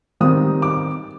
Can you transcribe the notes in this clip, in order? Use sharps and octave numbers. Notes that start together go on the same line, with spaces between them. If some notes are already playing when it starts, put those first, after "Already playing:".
D#3 G3 C4 D#6
D6